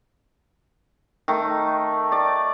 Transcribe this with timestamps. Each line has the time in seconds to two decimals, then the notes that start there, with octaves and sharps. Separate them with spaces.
1.28 D#3 A3
2.12 D5